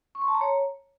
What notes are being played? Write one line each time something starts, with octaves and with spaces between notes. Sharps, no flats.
C#6
C6
A5
A#5
C#5